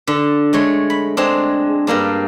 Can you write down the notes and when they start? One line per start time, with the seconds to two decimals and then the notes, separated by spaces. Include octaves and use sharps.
0.07 D3
0.53 G#3 A3 C#5
0.90 B5
1.17 G#3 C4 D4
1.87 G2 G3 A#3 D4